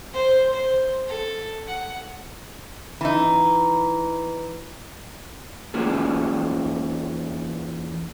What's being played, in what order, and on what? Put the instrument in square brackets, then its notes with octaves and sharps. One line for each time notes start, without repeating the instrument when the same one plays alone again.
[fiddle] C5
C5
A4
F#5
[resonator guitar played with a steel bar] E3 D#4
[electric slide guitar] E2 A#3 C#4 F4 G#4